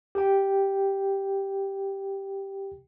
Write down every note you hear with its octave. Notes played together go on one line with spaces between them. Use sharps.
G4 G5